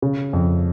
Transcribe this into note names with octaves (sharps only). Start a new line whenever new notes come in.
C#3
F2